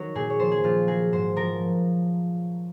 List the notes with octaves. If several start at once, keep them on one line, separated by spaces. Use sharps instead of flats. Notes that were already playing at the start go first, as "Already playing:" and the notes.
Already playing: D#3 F#3 A#4 C#5
A#2 G#4
C#5
F3 C5
G#4
A#2 F4
F#3 G#4
G#2 C5
F3 A#4